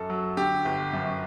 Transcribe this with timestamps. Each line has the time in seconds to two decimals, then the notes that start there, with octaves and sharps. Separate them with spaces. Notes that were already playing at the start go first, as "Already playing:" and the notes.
Already playing: F#2 A4
0.10 F#3
0.37 D3 G4
0.65 G1
0.93 F#2